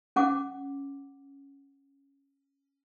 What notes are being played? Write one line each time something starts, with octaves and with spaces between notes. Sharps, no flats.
C#4 F#5 D6